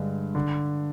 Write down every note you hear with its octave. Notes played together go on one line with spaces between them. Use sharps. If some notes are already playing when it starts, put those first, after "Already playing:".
Already playing: G2 D3 G#3
D3